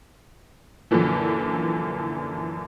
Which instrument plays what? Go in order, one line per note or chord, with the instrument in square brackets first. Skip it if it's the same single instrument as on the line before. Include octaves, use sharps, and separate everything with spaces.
[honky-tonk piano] F#2 A#2 D3 E3 F3